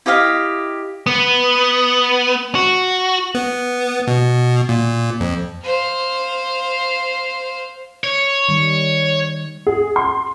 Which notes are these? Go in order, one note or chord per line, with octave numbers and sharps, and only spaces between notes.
E4 G4 D#5 F5
B3
F#4
B3
B2
A#2
F2
C5 F5
C#5
D#3 G3
G#4
C6